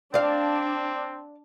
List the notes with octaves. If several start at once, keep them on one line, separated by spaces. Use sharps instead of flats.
C4 D4 D5 F5